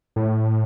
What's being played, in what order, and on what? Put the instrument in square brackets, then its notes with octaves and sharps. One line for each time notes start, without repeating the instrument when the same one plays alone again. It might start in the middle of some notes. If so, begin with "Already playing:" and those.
[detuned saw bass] A2